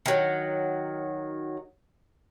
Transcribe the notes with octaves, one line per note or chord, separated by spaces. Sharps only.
D#3 F#3